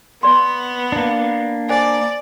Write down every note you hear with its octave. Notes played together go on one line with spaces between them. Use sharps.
B3 D5 C6
A#3 D4
C5 D5 G#5